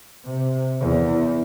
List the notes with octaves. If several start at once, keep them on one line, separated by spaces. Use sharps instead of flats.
C3
E2